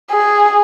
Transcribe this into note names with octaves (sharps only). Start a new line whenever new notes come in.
G#4